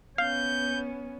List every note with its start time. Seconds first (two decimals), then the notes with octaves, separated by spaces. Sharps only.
0.18 B3 C#4 F5 G6